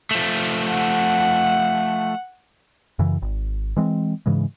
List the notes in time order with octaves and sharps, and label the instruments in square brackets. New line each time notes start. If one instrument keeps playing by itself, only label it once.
[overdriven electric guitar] F3 A3
[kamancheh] F#5
[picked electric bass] F#2 C#3 E3
G#1
E3 G#3 C4
G#2 C#3 E3 G#3